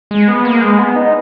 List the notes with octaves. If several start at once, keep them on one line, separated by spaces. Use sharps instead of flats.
G#3
B3
A#3
G#3
B3
D#4